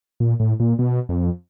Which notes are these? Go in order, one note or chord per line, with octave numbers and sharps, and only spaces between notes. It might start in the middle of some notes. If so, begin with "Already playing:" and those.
A#2
A2
A#2
B2
F2